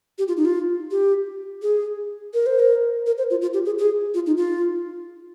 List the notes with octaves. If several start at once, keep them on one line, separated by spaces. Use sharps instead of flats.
G4
F4
D#4
F4
G4
G#4
A#4
C5
A#4
A#4
C5
F4
F4
G4
G#4
G#4
F4
D#4
F4